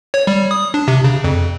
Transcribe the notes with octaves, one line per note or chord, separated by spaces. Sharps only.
C#5
G3
D#6
D4
C3
C#3
F2